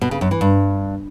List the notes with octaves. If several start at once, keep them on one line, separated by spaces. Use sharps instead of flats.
B2
C#3
F#2
E3
G2